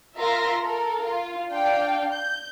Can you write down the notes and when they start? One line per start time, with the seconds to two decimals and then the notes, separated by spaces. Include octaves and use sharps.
0.17 F4 A#4 E5 F5 C6 A#6
0.60 A4 A#4
1.02 F4
1.50 D4 F5 G5
2.14 G6